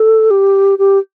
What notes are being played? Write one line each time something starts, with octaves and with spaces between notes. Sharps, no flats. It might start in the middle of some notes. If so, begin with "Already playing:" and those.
Already playing: A4
G4
G4